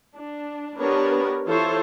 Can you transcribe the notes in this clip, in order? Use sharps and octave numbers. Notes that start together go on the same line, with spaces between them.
D4
B3 D4 G4 A#4 B4 C#5
E3 E4 F4 A4 C5 C#5